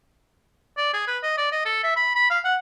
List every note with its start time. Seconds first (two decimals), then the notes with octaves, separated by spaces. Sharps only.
0.77 D5
0.94 G#4
1.08 B4
1.23 D#5
1.37 D5
1.52 D#5
1.66 A4
1.83 E5
1.96 B5
2.15 B5
2.30 F5
2.45 F#5